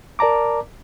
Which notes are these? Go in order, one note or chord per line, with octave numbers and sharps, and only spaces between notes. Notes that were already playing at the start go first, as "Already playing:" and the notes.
A#4 D5 A5 A#5 D6